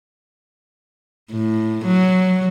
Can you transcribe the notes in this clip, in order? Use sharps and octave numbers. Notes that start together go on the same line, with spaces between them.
A2
F#3